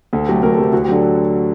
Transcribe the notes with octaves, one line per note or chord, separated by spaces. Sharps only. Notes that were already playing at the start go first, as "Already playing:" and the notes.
D2 A4
C3 F#3 A3 G4
D2 A#4
A4
C3 F#3 A3 G4
D2 F#4
G4
D3 F#3 A4